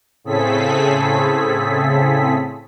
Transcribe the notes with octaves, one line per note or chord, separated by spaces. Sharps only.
A2 C#3 C4 G#4 A4 B6